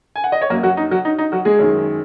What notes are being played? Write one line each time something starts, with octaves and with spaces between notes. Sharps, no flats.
G#5
F#5
D#5
C#5
F#2 F#3 A#3 A#4
F#3 F#4
D#4
F#3 F#4
D#4
D#4
F#3 F#4
G#3 G#4
F#2 D#3 G#3